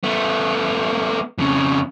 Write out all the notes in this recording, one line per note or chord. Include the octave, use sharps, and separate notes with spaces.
A3 B3
F2 C#3